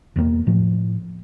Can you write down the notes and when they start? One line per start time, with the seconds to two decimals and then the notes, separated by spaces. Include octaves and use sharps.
0.16 E1 E2 E3 A#3
0.47 A2 F3